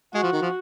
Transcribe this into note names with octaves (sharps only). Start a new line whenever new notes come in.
G#3 F#4
F3
D#3
F3